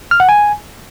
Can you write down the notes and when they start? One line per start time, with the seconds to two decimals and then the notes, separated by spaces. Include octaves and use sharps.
0.11 F6
0.20 F#5
0.29 G#5